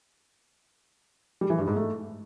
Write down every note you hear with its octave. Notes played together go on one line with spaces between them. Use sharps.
G3
E3
G2
G#2
A3